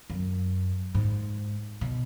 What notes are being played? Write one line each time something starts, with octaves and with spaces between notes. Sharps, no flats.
F#2
G#2
B2